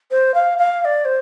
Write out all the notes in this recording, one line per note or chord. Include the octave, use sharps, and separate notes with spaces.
C5
F5
F5
F5
D5
C5